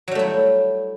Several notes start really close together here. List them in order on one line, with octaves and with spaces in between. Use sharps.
F#3 G3 A3 E4